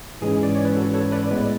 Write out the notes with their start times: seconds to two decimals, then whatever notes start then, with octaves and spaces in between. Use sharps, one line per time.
0.21 G#2 E3 G#3 C#4 G#4
0.43 D5
0.55 C#5
0.65 B4
0.76 F#4 A4
0.94 A4 C#5
1.12 B4 D5
1.31 A2 G#3 B3 B4 D5